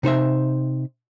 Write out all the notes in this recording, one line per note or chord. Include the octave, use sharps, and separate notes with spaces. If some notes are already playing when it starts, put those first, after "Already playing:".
C3 D#4 C5 E5